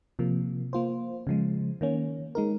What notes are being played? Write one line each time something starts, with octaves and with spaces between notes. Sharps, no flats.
C3 F3 A#3
A#3 F4 C5
C#3 F3 G#3
D#3 A#3 C#4
G#3 D#4 A#4